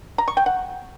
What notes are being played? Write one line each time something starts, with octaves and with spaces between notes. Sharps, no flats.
A#5
C#6
G5
F#5